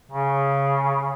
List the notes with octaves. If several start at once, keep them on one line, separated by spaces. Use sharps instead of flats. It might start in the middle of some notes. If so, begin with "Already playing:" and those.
C#3